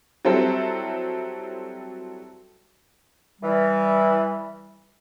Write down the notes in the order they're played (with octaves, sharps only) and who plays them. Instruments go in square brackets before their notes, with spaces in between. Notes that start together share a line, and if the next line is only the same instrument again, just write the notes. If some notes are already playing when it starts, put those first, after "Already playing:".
[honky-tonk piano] F#3 G3 C4 E4 A4 C5
[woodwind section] E3 G3